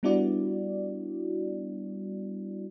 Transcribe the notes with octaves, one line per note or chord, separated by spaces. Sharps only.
G3 B3 D4 E4 F#4 D5